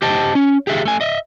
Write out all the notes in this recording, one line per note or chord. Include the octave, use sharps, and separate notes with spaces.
G4 C5 D#5 G5 A5
C#4
G4 G#4 E5 F5
A3 G#5
D#5 E5